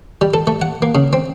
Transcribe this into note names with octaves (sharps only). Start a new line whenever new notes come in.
G3
A4
A3
F#5
A#3
C#3
C4